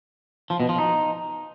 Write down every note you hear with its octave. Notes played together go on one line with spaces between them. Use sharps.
F3
B2
F3
D#4